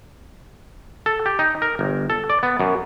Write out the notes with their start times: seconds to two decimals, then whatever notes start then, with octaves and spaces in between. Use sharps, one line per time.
1.06 A4
1.26 G4
1.39 D#4
1.62 A#4
1.79 G1
2.10 A4
2.30 D5
2.43 B3
2.59 F#2